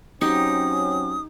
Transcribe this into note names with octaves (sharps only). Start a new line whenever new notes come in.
F#3 C4 C#4 D#4 G4 D#6